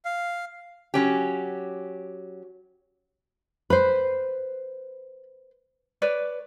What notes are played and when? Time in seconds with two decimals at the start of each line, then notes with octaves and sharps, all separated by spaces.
0.05 F5
0.94 F#3 C#4 G4
3.70 B4 C5 B5
6.02 B4 C#5 D5